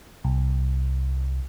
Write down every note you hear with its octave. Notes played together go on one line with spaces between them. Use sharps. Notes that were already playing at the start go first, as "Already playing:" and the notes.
C2